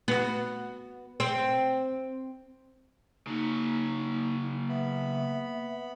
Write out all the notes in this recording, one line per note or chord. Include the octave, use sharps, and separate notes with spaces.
B3 F#4
C4
C#3 F#3 A#3 D#4
B3 E5 B5